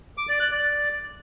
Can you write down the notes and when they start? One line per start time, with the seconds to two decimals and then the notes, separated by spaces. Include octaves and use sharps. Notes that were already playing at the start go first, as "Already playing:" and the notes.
0.17 D6
0.29 D5
0.40 F#6
0.51 D5